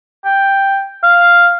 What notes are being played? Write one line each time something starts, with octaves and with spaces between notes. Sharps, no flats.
G5
F5